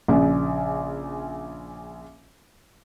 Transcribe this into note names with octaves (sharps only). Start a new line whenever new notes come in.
A#1 C#3